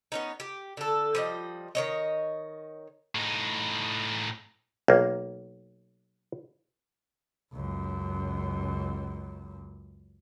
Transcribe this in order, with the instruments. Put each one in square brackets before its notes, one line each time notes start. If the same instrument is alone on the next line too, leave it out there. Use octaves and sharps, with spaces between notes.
[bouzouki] B3 C#4 D#4
G4
D3 A4
F3 G3 D#5
D#3 C#5 D#5
[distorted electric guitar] A2 D#4
[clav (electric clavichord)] B1 A#3
[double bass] C#2 F#2